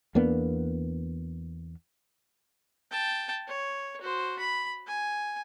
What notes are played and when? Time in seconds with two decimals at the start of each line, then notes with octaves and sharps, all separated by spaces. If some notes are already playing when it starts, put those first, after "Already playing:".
0.15 E2 A#3 B3 D4
2.91 G5 A5
3.47 C#5
4.01 F#4 C5
4.39 B5
4.87 G#5